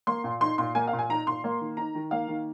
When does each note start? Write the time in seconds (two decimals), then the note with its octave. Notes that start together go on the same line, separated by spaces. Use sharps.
0.07 A#3 C6
0.24 A#2
0.41 D#4 C6
0.58 A#2 C6
0.75 A#3 G#5
0.87 F5
0.93 A#2
0.99 G#5
1.09 D#4 A#5
1.27 A#2 C6
1.44 A#3
1.61 D#3
1.77 D#4 A#5
1.95 D#3
2.11 A#3 F5
2.28 D#3